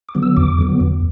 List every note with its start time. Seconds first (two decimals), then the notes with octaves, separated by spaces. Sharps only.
0.09 D6
0.15 D3 F#3 B3
0.23 E6
0.37 E2 D6
0.58 D3 F#3 B3
0.80 E2